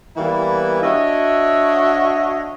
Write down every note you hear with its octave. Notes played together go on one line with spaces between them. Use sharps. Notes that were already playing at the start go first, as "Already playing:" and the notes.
E3 G3 A#3 B3 E4
D4 F#4 C#5 D#5 E5